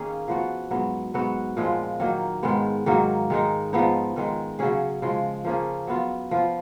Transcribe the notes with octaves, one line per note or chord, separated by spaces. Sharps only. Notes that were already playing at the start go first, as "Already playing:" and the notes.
Already playing: D#3 A#3 C#4 G#4
F3 B3 F#4
G#2 F#3 B3
G#2 F#3 B3 F#4
A#2 F3 G#3 B3
D#3 F#3 A#3
G#2 D#3 G#3 B3
G#2 D#3 F#3 A#3
D#3 G#3 D#4
G#2 F3 B3 D#4
G#2 D#3 G#3
C#3 F#3 C#4 G#4
C#3 F3 G#3
F3 A#3 C#4 G#4
F#3 B3 F4
F3 B3 F4